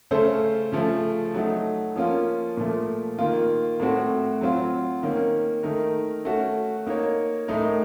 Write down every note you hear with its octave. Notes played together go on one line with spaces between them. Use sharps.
C#3 A3 C#4 A4 C5
C#3 F3 A3
F#3 A3 D#4
F3 A#3 C#4 F4
A#2 F3 A3
D#3 A#3 F4
A2 A3 C4 F#4
F#3 C4 F4
D#3 A#3 C#4
D#3 A3 D#4 A#4
A3 C#4 F#4
A#3 D#4 A#4 C#5
A2 A3 D#4 A#4